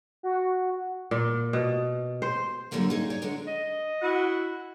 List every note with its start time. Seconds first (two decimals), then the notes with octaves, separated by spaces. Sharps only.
0.23 F#4
1.11 A#2
1.53 B2
2.22 C5
2.71 D3 F#3 G3 A#3 E4
2.90 D#4 G#4
3.10 C#5 D5
3.22 D3 F#3 G#3 A3
3.47 D#5
4.02 E4 F#4